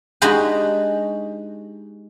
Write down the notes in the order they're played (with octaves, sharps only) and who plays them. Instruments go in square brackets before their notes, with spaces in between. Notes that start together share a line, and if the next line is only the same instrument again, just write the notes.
[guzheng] G#3 D4 D#4 F#4 G4 G#5